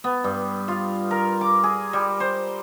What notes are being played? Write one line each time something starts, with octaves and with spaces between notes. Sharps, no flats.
B3
G2
F4
A#4
D6
G#4
G3
C5